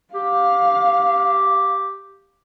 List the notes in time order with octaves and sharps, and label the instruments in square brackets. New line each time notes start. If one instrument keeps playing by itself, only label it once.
[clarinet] G4 [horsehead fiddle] F5